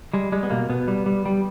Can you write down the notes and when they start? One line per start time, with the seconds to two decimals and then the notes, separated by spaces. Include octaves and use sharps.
0.13 G3 G#3
0.32 G3 G#3
0.43 B3
0.50 B2 A#3
0.69 B2 B3
0.88 G3
1.06 G3
1.26 G3